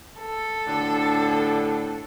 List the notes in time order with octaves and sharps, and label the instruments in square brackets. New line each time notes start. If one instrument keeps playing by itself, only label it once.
[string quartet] A4
[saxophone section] D2 A2 D3